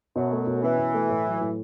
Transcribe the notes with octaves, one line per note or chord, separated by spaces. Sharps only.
F#2 B2 F#3
A3
B2
E3 C#4
B2
A3
A2
F#3
A2